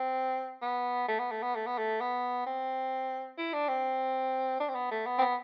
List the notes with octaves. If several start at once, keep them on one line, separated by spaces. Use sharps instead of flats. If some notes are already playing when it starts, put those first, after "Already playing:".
Already playing: C4
B3
A3
B3
A3
B3
A3
B3
A3
B3
C4
E4
D4
C4
D4
C4
B3
A3
B3
C4
B3